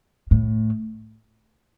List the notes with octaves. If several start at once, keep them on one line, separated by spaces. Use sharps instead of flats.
A2